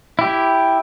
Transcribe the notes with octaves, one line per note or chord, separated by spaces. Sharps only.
E4 G4